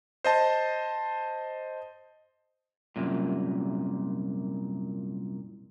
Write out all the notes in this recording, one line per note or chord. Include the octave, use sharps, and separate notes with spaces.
C5 D#5 A5
C2 F#2 A#2